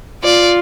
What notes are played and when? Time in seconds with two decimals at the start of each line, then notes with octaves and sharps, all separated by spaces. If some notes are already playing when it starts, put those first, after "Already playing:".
0.23 F4 D5